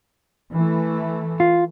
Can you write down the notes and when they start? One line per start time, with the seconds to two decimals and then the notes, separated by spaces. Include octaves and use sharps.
0.54 E3 A3
1.40 F4